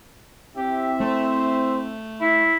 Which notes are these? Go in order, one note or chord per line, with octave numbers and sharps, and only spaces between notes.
C4 E4 G4 E5
A3 C5
E4 E5